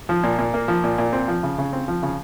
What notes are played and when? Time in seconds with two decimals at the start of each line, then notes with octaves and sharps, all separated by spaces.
0.09 F3
0.23 A#2
0.39 A#2
0.54 A#3
0.68 F3
0.84 A#2
0.98 A#2
1.13 C4
1.28 F3
1.43 C#3
1.58 C#3
1.73 C4
1.88 F3
2.03 C#3